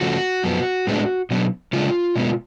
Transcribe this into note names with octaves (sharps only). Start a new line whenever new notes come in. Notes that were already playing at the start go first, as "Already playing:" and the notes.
C#3 F3 A3 F#4
F#2 F3 B3
A2 G#3 B3 D4
B2 F#3 B3 D4
C#3 G#3 D4 F4
B2 G#3 B3